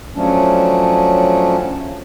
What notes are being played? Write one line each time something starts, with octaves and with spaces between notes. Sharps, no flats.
F3 F#3 A3 C#4 D4